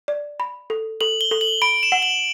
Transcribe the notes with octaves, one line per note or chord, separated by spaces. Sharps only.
D5
B5
A4
A4 F#7
G7
A4
F#7
B5 D7
E7
F#5
F#7